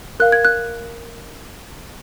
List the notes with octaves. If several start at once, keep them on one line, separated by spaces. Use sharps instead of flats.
A#4 F5 F#6
G#6
F#6